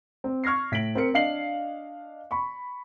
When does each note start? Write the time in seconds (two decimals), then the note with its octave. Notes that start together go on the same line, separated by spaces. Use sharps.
0.24 C4
0.44 C#6 F6 G#6 A#6 C7
0.72 A2 B6 D7 F#7
0.95 C4 A#4 C#7
1.14 D4 D#5 F5 C7 F#7
2.31 B5 C#6